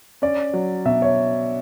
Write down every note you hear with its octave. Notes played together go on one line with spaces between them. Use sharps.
C#4 D5
F#3
B2 E5
C#5